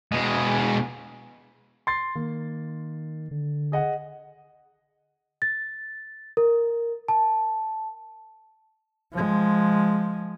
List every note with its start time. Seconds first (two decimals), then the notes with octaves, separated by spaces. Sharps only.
0.12 B2 G#3
1.87 C6 A6 C7
2.15 D#3 A#3
3.31 D3
3.72 G#4 D#5 F#5
5.42 A6
6.37 A#4
7.08 A5
9.13 F3 G#3